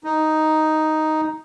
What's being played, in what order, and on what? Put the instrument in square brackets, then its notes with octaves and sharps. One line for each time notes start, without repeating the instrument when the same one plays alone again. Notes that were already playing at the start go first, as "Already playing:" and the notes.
[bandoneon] D#4